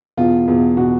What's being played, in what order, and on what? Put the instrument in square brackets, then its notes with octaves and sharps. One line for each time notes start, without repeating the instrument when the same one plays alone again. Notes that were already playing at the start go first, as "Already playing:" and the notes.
[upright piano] E2 B2 F4
E2 B2
B2 F#4